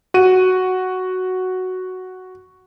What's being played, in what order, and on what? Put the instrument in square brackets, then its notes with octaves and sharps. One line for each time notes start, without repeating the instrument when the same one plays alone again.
[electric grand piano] F#4 D#7